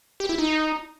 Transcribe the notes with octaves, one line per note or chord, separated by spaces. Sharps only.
G4
E4
D#4